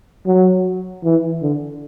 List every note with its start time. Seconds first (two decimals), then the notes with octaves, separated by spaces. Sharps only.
0.27 F#3
1.04 E3
1.42 D3